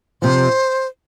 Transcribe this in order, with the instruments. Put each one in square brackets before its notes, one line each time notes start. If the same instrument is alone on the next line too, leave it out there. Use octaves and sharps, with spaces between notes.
[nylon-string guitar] F2 C3 F3 [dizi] C5